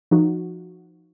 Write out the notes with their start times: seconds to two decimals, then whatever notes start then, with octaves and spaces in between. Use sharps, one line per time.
0.11 F3 D#4 F#4